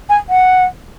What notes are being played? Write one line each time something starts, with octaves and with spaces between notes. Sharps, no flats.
G#5
F#5